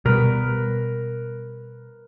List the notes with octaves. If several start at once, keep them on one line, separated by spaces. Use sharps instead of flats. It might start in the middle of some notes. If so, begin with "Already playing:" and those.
B2 G3 A#4 B4